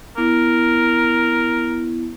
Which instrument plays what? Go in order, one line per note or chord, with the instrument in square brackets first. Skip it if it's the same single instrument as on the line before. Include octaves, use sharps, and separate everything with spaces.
[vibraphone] B3 E4 [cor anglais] A#4